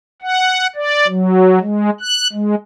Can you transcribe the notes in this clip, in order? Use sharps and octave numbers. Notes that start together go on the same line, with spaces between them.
F#5
D5
F#3
G#3
F#6
G#3